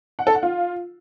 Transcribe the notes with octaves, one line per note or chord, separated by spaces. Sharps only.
F#5
A4
F#5
F4